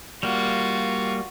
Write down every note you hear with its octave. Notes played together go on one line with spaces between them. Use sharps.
G3 A#3 F4 F#4